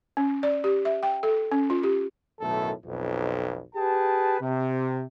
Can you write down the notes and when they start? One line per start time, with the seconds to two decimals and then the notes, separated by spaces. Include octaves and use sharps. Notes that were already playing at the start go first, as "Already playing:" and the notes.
0.17 C#4
0.43 D5
0.64 G4
0.85 E5
1.03 G5
1.23 A4
1.52 C#4
1.70 F4
1.83 G4
2.41 B1 F#2 A2 D#3 A3 A4
2.86 B1 F2
3.76 G4 G#4 B4 G5 A5
4.41 C3